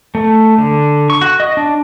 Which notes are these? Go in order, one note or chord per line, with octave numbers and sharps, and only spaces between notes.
A3
D3
C#6
F#4
D#5
D4